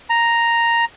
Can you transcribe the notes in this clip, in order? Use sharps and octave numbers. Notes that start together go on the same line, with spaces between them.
A#5